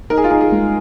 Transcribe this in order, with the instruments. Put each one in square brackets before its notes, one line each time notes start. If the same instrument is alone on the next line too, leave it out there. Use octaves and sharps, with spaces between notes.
[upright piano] D#4 [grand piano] A#4
[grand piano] G#4
F4
[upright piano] D#4 [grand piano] G#4
[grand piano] G#4
[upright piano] G#3